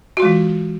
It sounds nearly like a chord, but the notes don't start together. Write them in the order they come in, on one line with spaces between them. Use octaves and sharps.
F#4 F4 G#3 E3